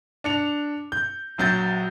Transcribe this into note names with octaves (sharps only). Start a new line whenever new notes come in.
D4 C#7 F7
G6
A#1 F#3 G6 A6